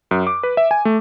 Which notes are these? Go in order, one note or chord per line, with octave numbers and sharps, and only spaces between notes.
F#2
D6
B4
E5
G#5
A3